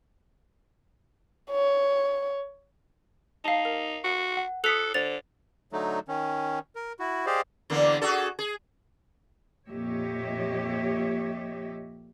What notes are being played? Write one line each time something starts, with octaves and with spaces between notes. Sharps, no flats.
C#5
D#4 F5 A5 C7 F7
A#4
F#4
F#5
A4 D#6 F#6 B6 C#7 F7
D3 C5 A6 F7
D3 F#3 A3 D#4
D#3 C#4
A#4
E4 F#4
G4 G#4 C5 D5 D#5 F5
E2 D3 A#3
F#4 G#4 A4
G#4
F2 A#2 G4 C#5 D#5 E5